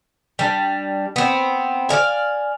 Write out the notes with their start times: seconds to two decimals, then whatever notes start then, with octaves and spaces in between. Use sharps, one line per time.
0.39 G3 D4
1.16 B3 C4
1.89 D5 D#5 F5 G#5